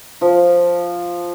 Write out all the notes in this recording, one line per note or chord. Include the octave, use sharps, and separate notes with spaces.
F3